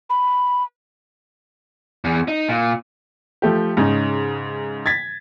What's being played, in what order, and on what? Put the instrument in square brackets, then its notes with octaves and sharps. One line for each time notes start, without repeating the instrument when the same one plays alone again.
[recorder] B5
[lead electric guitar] E2
D#4
A#2
[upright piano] F3 A3 G4
G#2 C#3 G#3 C#4 D#4
G#6 A6 B6